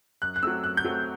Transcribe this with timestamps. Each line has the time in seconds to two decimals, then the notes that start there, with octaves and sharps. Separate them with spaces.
0.22 F#2 F#6
0.36 F#6
0.43 F#3 A3 C4 E6
0.64 F#2 F#6
0.77 G6
0.84 F#3 A3 C4